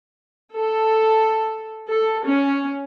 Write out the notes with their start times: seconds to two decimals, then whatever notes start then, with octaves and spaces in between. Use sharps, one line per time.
0.54 A4
1.86 A4
2.23 C#4